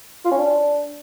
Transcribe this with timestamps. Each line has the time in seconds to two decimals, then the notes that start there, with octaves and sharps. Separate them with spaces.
0.25 F4
0.31 C#4
0.38 D4